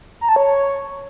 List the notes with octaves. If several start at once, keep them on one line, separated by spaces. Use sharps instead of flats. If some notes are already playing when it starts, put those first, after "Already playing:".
A#5
A5
C#5